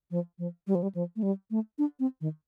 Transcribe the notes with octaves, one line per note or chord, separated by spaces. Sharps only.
F3
F3
G3
F3
G3
F3
A3
G3
A3
D4
C4
D#3